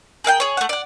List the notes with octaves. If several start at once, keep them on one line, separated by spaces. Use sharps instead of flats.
G#4 A#4 F5 G5
G#4 C#5
A3 F#5
D5 F#5